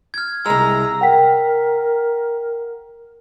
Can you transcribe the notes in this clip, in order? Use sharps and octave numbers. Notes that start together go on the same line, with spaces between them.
F6 G#6
C2 G#3 A#5 E6
A#4 F#5 G5 B6